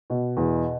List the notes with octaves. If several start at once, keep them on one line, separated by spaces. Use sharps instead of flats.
B2
E2